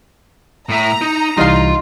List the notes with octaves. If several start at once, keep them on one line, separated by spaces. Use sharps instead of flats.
A2 E5 A#5
D#4
C2 E3 G3 D#4 F4 F5 C6